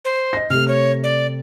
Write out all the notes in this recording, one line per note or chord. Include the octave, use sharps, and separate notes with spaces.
C5
D#5 A#6
C3 A3 F6
C#5
D5